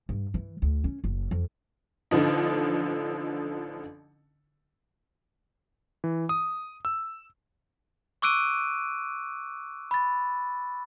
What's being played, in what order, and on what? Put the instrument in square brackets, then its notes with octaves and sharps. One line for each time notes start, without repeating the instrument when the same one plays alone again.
[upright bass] G2
E3
D2
C#4
F#1
F2
[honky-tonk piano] A1 D3 F3 D#4
[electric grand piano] E3
D#6
E6
[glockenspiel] C#6 D6 E6 F#6 D7 D#7
B5 A6